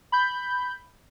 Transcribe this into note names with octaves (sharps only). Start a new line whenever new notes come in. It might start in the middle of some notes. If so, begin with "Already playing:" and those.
B5 G6